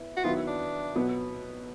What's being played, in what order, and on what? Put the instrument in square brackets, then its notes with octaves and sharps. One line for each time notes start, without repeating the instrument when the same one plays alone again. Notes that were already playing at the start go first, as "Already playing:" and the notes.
Already playing: [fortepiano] B3 E4
[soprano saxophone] F#4
[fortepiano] D#3 F#3 B3 E4 [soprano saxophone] F4
[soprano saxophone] D4
[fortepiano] B2 F#3 B3